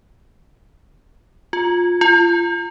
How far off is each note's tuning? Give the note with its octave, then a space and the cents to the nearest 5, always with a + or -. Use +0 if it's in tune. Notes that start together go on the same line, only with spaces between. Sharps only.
F4 +15
F4 -30